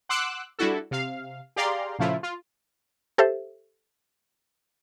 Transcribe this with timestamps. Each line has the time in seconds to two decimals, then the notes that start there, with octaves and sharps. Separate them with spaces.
0.09 F#5 C6 D6 E6 F#6
0.59 G3 D4 E4 F#4 A4
0.91 C3 F5
1.56 G4 G#4 D5 F5 A#5 C6
1.99 A#2 C#3 F3 A3 E4 F4
2.23 F4
3.18 G4 A4 C5 E5